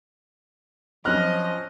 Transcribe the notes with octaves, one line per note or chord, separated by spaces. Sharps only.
F3 F#3 C4 C#4 D#5 F6 F#6